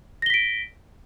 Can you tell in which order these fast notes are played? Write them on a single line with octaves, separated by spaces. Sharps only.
A#6 G7 B6 D7